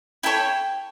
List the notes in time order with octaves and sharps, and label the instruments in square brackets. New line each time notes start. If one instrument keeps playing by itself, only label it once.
[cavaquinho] E4 A4 C#5 G5